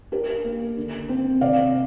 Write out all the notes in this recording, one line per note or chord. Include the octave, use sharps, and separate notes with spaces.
D4 G4 A#4
A#3
D3
C4
C3 D5 F5